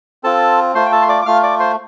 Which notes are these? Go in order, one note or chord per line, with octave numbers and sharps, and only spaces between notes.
C4 F4 A4 A5
A3 F4 C5 C6
G5
A4 A5
C6
D5 D6
D6
A3 F4 F5 F6
D5 D6
C5 C6